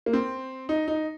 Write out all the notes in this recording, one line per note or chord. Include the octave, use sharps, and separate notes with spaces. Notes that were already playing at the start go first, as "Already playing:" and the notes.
A#3
C4
D#4
D#4